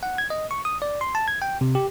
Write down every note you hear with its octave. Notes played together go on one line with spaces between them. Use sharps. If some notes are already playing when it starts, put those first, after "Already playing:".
F#5
G#6
D#5
C#6
D#6
D5
C6
A5
G#6
G5
C3
G4